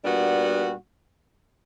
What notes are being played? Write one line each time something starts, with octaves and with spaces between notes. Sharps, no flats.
A#2 G3 B3 D4 F#4